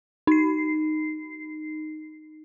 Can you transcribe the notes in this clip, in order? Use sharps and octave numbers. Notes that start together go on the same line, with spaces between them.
D#4 C7